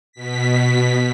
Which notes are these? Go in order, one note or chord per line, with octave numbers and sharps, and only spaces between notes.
B2 B6